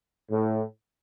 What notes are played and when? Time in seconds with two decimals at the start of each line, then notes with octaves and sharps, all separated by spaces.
0.29 A2